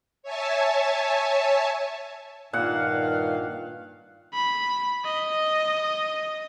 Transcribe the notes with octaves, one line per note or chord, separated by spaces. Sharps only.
C#5 E5 G#5 A5
G2 A#2 D#3 F5 F#5
B5
D#5